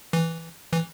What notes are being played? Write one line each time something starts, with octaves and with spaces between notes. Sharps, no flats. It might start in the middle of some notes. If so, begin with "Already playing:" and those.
E3
E3